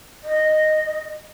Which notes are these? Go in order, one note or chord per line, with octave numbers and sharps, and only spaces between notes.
D#5